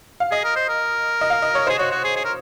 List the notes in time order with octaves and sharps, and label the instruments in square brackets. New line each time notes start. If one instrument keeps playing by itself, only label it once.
[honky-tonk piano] F5
[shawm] G#4 [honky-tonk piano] D#5
[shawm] A#4
C5
A#4
[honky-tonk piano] D#5
F5
D#5
C#5
C5
[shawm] G#4
[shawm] F#4 [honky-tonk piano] C#5
[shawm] F#4
G#4
G#4
A#4